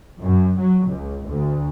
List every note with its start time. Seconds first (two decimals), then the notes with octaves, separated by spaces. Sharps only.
0.21 F#2
0.59 F#3
0.88 C#2
1.27 D2